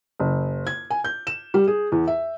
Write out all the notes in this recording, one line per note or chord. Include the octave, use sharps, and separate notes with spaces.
F#1
G#6
G#5
G6
E7
G3
G#4
E2
E5